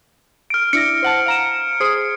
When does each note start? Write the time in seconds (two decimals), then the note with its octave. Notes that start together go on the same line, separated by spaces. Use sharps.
0.50 F6 D7
0.73 D4 E4 A#6 C#7
1.02 C5 F#5 A5
1.26 F5 A#5 E7
1.80 G#4 C5 D#6